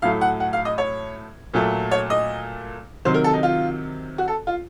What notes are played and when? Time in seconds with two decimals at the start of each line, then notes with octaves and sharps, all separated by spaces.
0.02 A2 F#3 A3 F5
0.21 F#5
0.40 F#5
0.53 F5
0.65 D#5
0.78 C#5
1.54 A#2 F#3 A3
1.91 C#5
2.10 D#5
3.05 C3 D#3 F#3 C5
3.14 A#4
3.24 A4
3.33 D#4
3.43 F4
4.18 F#4
4.28 A4
4.47 F4